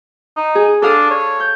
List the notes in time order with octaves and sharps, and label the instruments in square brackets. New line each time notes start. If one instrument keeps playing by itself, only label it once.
[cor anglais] D#4
[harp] G#4
[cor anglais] D4 [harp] A4 F5 D#6
[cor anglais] C#5
[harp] G6